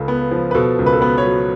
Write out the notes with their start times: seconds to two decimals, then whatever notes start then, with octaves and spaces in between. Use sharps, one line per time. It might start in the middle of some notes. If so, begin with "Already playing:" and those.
Already playing: C#2 C#3 A4
0.08 B3
0.31 F3
0.51 B4
0.55 B2 A4
0.79 C#2
0.86 B4
0.93 A4
1.00 B3 B4
1.18 C#5
1.26 F#3